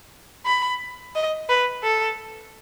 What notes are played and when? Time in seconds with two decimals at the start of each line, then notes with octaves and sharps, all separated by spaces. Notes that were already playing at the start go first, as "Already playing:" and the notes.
0.45 B5
1.15 D#5
1.49 B4
1.83 A4